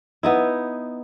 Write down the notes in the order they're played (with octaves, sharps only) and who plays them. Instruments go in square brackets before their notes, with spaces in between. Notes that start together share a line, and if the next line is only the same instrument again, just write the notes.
[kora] B3 D#4 E4